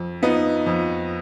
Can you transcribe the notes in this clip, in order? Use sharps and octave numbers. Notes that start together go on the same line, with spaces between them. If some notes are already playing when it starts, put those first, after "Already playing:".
Already playing: F2
F3 B3 D#4
F2